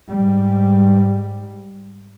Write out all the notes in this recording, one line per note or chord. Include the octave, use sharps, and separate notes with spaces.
G#2 G3